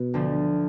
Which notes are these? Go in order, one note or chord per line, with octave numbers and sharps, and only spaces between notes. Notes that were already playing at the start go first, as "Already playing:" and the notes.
Already playing: B2 B3
D2 D3 F3